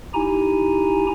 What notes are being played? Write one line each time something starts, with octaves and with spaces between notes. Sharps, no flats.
D#4 E4 G4 G#5 A#5